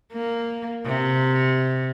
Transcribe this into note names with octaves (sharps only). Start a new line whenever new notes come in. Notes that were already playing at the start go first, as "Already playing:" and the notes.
A#3
C3